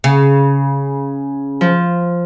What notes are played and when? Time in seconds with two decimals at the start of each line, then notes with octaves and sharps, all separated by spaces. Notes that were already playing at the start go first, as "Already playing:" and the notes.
0.04 C#3
1.61 F3